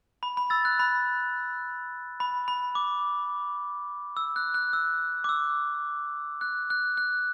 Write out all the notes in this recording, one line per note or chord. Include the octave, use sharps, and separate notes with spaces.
B5
B5
E6 A6
F#6
B5
B5
B5
D6
E6
F#6
F#6
E6
D6
E6
F#6
F#6
F#6